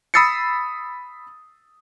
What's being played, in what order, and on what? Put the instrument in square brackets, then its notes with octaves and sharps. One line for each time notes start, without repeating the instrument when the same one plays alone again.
[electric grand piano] B5 D#6 E6 A6 C7 C#7